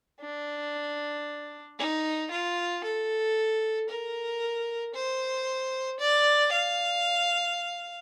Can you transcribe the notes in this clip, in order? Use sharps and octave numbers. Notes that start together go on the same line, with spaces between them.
D4
D#4
F4
A4
A#4
C5
D5
F5